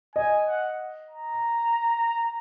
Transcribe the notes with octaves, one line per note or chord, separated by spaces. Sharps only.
D#5 G#5
F#5
A#5